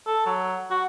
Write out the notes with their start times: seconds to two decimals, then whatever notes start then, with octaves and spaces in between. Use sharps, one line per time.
0.07 A4
0.26 F#3
0.70 F#4